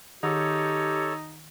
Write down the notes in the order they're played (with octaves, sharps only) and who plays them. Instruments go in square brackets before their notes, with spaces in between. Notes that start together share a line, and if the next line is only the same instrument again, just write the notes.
[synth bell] D#3 [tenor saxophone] D#4 [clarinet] G4 [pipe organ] A4 C#5